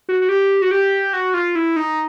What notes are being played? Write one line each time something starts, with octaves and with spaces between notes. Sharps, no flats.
F#4
F#4
G4
F#4
G4
F#4
F4
E4
D#4